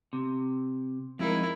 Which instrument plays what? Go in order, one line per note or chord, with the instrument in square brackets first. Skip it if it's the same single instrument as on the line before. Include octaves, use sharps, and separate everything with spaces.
[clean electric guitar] C3
[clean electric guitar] F2 G#3 D#4 [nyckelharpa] E4 A#4